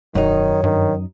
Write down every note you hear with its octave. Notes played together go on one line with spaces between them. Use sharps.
E1 F#2 D#3 D#4 C#5
G2 D#3